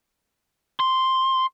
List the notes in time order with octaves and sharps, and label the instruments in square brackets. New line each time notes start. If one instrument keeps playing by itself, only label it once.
[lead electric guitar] C6